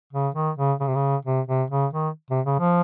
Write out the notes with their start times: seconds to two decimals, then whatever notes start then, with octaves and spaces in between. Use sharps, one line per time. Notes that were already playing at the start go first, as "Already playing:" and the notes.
0.13 C#3
0.35 D#3
0.57 C#3
0.80 C#3
0.87 C3
0.95 C#3
1.25 C3
1.48 C3
1.70 C#3
1.93 D#3
2.30 C3
2.46 C#3
2.60 F3